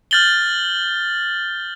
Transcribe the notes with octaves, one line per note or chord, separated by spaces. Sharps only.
F6 G6 A6 F#7 G7